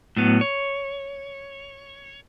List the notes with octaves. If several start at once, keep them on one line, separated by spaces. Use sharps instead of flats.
A2 F#3 B3
C#5